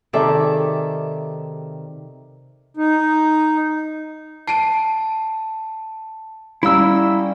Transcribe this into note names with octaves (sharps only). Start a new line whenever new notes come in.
C3 D#3 G#4 A4 D5 E5
D#4
A5 C7 D7 D#7
G3 C#4 E4 D5 F5 A#5 E6